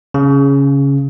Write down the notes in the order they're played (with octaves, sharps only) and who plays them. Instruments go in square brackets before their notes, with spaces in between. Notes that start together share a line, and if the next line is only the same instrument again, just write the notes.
[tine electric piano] C#3